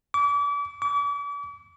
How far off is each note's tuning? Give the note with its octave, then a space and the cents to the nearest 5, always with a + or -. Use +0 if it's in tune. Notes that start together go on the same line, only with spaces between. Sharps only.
D6 -35
D6 -40